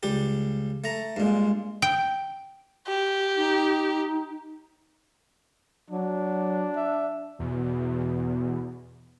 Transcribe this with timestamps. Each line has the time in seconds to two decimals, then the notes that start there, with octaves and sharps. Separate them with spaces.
0.03 C#2 G3 G4
0.84 A3 A#5
1.17 G2 A#2 G#3
1.82 G5
2.87 G4
3.37 D#4
5.91 F#3 D4
6.76 E5
7.39 E2 B2